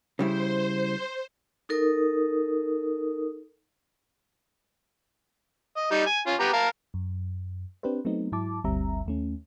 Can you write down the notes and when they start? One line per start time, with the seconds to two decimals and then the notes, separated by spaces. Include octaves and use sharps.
0.19 C#3 G3 E4 C5
1.69 D#4 A4 A#4 D#6
5.77 D#5
5.91 G3 D#4
6.06 G#5
6.27 C#4 F4
6.40 B3 G4 A#5
6.53 A#4 F5 A5
6.94 F#2
7.83 C4 D4 G4 B4 C5
8.05 F#3 A3 B3 C4 D#4
8.32 G#2 F#3 E4 A5 D6
8.64 G1 D2 G3 C4 E5 A#5
9.06 D#2 A3 C#4